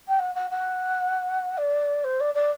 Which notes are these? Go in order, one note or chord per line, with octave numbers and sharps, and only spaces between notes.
G5
F#5
F#5
F#5
D5
C5
D5
D5